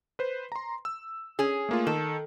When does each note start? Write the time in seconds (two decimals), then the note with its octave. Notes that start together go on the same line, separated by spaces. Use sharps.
0.19 B4 C5
0.52 A#5 C6
0.85 E6
1.39 C#4 G#4
1.69 A3 A#3 F4
1.87 D#3 A4